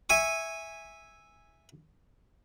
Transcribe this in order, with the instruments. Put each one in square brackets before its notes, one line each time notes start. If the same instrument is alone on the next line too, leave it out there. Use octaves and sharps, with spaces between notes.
[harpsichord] E5 G#5 C#6